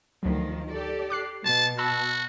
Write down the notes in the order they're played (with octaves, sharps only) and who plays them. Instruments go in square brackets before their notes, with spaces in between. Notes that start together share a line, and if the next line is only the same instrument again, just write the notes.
[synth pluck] D2 F#3 [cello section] D#3 F3
[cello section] G4 A4 D5
[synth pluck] D6 F#6 C7
[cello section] B2 [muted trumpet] A5
[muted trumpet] F#4 [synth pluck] A5 B5 E6